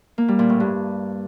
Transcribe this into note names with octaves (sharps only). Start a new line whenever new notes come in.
A#3
G3
A#2
A2
G2